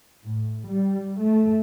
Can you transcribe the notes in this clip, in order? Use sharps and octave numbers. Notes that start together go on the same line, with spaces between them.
A2
G3
A3